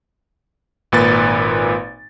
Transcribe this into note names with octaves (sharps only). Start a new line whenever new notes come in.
G#1 A#2 B4 A6